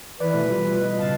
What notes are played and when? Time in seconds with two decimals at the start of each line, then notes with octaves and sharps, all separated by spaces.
0.20 E3 B4 D5
0.34 B2 A3
0.49 G3 F4
0.81 D#5
0.98 C#2 G#2 C#3 F5 A5